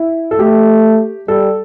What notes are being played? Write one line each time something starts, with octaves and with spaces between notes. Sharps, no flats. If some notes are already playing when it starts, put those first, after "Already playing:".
Already playing: E4
A4
A3 G4
G3 A4